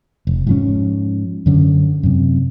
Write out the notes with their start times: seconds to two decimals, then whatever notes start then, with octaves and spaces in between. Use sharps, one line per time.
0.27 F1
0.47 G#2 F3 C#4
1.46 F#2 D3 C#4
2.03 F#2 C3